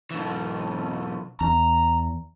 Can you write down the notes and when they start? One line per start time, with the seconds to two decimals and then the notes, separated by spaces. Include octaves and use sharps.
0.11 B1 E3
1.41 E2 A#5